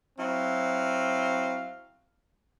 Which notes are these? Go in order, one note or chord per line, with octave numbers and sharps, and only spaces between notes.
F#3 C4 E4 F5